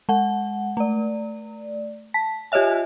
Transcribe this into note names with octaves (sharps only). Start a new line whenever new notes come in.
G#3 F#5
A3 D5
A5 B6
F4 G4 C#5 D#5 E5 G#5